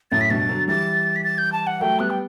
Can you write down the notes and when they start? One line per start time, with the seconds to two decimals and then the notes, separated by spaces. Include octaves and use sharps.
0.11 F#2 A2 A6
0.21 B6
0.30 G2 B2 A6
0.49 D3 F#3
0.67 E3 G3 A6
1.16 B6
1.24 A6
1.38 G6
1.52 A5
1.67 F#5
1.80 F#3 A3 G5
2.00 G3 B3 F#6
2.10 G5